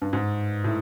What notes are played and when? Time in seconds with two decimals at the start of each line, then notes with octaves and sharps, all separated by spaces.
0.02 G2
0.13 G#2
0.64 A2